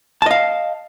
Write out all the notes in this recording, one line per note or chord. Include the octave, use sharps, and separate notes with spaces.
D#5 F5 A5